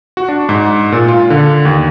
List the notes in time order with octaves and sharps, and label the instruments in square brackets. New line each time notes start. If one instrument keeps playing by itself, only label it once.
[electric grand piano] F#4
D4
G#2
A#2
F4
D3
D#2